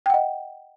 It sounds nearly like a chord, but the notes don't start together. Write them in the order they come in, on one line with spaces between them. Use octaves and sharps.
G5 F#5 D#5